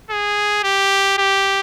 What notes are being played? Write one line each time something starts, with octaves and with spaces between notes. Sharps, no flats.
G#4
G4
G4